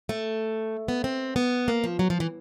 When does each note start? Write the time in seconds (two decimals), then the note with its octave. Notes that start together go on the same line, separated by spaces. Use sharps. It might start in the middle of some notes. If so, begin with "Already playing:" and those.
0.09 A3
0.88 B3
1.04 C4
1.36 B3
1.68 A#3
1.84 F3
1.99 F#3
2.10 F3
2.20 E3